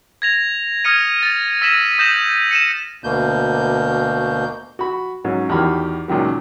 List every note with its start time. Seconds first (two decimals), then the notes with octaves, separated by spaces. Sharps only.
0.22 G#6 A#6 F7
0.84 D#6 F6 G#6 A#6 C#7 D#7
1.23 A6
1.62 E6 A#6 B6 D#7 E7 F#7
1.99 D#6 G6 A#6 E7 F#7
2.51 C#7 D#7 E7
3.04 D2 B2 A#3 G6
4.79 F#4 B5
5.25 G#2 F#3 C#4
5.49 E2 D#3 F#4 G4 B5 F6
6.08 C#2 A#2 D#3 F#3